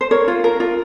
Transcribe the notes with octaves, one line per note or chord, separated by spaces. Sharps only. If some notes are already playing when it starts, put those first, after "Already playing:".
C5
A#4 C#5
F4
A#4
F4